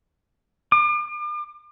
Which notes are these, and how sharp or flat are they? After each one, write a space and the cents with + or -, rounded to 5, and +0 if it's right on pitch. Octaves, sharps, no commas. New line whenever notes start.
D6 +40